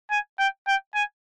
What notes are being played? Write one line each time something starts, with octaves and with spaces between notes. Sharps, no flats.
G#5
G5
G5
G#5